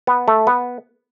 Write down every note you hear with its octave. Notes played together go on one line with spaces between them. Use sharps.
B3
A3
B3